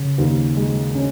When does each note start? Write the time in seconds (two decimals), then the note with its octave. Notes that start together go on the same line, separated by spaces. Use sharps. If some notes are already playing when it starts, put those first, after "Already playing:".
Already playing: C#3
0.18 D#2
0.57 G#3
0.95 C#4